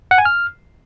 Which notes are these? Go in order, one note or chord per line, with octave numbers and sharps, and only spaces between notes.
F#5
G#5
F6